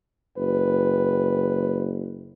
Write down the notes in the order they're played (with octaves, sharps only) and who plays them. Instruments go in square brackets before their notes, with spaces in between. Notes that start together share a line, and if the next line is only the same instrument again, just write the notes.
[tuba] F#1 [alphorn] B4